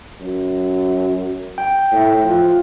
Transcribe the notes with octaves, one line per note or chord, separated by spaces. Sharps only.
F#2
G5
A2 E4
F3 F4